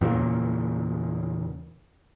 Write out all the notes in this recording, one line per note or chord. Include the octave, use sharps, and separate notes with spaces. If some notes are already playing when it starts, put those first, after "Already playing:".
E2 A#2 C#3 A#3